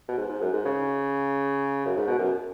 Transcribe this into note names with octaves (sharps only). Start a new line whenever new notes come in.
B2
G#2
G#2
F#2
G#2
C#3
F#2
G#2
B2
F#2